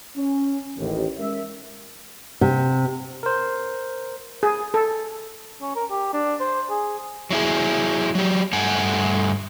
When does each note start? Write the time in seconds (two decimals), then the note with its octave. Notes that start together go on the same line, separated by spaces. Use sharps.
0.16 C#4
0.78 A1 D#2
1.19 G#3 C#4 A#4 E5
2.41 C3
3.23 A#4 C5
4.43 G#4
4.74 A4
5.61 C#4
5.76 A#4
5.90 G4
6.13 D4
6.40 C5
6.70 G#4
7.31 F#3 E4 G#4
8.15 F#3 G4
8.53 G2 A3 F#5 G#5